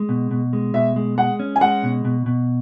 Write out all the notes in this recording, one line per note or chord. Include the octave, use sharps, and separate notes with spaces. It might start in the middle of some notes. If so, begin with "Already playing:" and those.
Already playing: G#3
B2
B2
G#3
B2 E5
G#3
G#3 F#5
C#4
G#5
G#3 F#5
B2
B2
B2